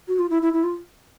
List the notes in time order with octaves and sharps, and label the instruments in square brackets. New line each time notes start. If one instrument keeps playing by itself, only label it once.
[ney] F#4
F4
E4
E4
E4
F4